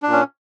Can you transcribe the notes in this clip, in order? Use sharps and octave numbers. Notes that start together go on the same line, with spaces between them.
A#2 C#4 D4